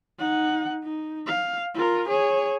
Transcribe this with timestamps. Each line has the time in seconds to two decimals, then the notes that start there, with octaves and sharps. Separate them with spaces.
0.19 D#4 F#5
0.83 D#4
1.27 F5
1.75 F4 A#4
2.08 G#4 C#5